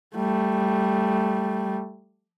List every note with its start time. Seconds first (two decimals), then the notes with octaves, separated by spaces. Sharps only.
0.16 G3 A3